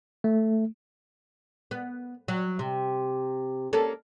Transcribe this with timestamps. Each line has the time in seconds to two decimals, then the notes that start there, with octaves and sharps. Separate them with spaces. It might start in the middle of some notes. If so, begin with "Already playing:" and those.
0.24 A3
1.71 B3
2.28 F#3
2.59 C3
3.73 A#3 C#4 A4